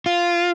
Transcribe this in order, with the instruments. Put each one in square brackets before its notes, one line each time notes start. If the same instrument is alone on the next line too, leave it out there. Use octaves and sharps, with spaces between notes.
[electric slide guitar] F4